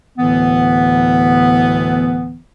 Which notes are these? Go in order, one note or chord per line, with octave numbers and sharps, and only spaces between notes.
D2 A2 D3 E3 B3